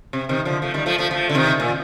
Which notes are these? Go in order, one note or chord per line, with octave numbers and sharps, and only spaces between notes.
C3
C3 D#3
D3 F3
F3 A3
D#3 G3
F3 A3
F3 A3
F3 A3
D3
C3 D#3
A#2